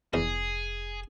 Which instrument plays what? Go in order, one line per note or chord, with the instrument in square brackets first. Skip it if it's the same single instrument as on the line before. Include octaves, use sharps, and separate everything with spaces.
[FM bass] F1 [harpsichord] E2 E3 D#4 [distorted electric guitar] G#4